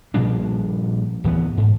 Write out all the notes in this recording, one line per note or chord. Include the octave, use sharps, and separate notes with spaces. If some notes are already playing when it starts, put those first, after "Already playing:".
A#2 F3 G3 D4
D1 E3 B3
G#2